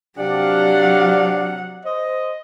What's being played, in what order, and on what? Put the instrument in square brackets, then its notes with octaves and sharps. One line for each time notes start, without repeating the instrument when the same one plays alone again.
[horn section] C3 D5 [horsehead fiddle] F#3 F#5 [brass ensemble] D4 G4 F5
[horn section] C5 D#5